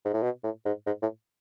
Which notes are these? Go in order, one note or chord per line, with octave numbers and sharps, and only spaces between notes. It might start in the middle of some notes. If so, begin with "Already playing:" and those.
G#2
A2
B2
A2
G#2
G#2
A2